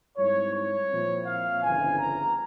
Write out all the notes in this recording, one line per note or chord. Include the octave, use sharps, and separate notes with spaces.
G#2 G3 C4 E4 C#5
C#5
A#2 F3 C4 E4
F5
G1 F2 C#3 E3 G#5
A#5